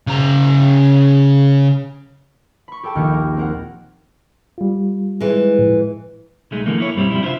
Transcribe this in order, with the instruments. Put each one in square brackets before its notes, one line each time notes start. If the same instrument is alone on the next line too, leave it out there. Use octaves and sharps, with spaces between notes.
[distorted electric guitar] C#3 A#5
[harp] B5 C#6
G4 A4 G5 A5
A#1 D#2 D#3 F6 C#7
A#4
C4 A#4 F#5
[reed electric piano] G3 F4
[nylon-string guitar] E3 G#3
[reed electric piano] A2 F3 A3
[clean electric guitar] B1 G#3 A3 D#4
D3 E3 F3 A3 A#3
A#3 E4 C#5
B1 G2 G3 C4 E4
C3 F3 G3 E4
D4 E4 F4 G#4 C5 E5